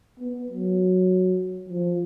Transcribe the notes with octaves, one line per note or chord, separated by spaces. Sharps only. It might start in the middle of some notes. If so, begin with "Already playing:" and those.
B3
F#3
F3